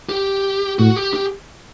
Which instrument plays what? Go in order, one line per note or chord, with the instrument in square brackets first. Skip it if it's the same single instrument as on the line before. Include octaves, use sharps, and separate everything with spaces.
[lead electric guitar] G4
[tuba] A2 [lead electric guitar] F#4
[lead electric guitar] G4
G4